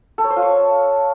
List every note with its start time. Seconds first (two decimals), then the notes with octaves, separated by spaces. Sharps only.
0.18 A4
0.24 C#5
0.30 C5
0.36 F4
0.42 C#5